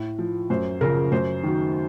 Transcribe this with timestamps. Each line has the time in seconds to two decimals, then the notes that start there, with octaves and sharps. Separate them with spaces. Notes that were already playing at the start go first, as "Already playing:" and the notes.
Already playing: A2
0.19 F3
0.50 F#2 C5
0.81 C#3 F3 A#4
1.12 F#2 C5
1.43 D#3 F#3